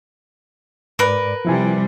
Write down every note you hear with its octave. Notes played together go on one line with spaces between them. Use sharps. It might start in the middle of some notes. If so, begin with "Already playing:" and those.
G#2 A#4 B4 D5
C3 F3 G3 E4 G#5